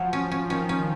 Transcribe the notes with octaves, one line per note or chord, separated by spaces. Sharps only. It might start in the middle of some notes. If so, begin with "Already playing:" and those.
Already playing: F3 F#3
C#4
C#4
D#3 C#4
C#4